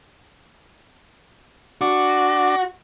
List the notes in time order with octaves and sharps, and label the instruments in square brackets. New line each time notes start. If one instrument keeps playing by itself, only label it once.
[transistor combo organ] D4 [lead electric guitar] F#4